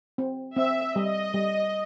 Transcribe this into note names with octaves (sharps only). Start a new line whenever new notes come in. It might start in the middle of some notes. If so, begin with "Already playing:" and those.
C4
C4 E5
G3 D#5
G3